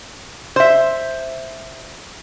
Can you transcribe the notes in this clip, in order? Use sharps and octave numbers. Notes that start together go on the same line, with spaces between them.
C5 E5